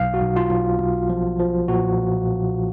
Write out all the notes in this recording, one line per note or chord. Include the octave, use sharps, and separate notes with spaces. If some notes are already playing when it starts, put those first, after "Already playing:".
Already playing: B1 F5
F#4
B1
F4
B1
B1
F3
F3
A#2 F#4